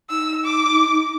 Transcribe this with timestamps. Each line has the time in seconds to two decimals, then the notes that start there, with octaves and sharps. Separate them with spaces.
0.10 D#4 E6
0.45 D6